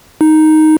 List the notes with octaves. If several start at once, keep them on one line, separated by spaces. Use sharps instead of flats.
D#4